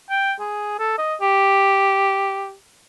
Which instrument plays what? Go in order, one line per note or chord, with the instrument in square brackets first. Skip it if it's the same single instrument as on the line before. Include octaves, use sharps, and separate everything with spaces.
[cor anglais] G5
G#4
A4
D#5
G4